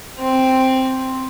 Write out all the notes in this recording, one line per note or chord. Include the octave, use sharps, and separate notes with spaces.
C4